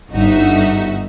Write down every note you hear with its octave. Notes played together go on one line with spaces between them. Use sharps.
G1 D#4 F#4 E5